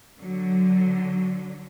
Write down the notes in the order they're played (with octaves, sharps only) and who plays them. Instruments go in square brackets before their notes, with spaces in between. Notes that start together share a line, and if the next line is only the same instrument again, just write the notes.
[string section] D3 F#3